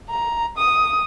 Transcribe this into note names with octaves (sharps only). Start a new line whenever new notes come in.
A#5
D#6